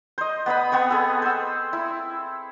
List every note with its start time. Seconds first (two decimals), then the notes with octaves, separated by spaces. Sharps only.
0.18 C5 D#5
0.46 B3 B4 D#5 B5
0.72 B3 C4 C#6
0.90 G#4 A4
1.22 C5 E6
1.73 E4